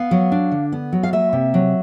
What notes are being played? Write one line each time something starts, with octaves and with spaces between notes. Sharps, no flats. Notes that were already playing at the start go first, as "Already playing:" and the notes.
Already playing: B3 F5
F#3
D4
D3
B3
F#3
F5
A#3 E5
C3
F#3